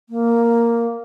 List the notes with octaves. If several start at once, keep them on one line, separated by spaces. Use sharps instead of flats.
A#3